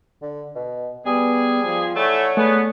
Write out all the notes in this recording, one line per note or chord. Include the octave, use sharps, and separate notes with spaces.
D3
B2
G3 B3 G#4
F3
E3 A3 C#5 D5 F#5
A3 B3 G#4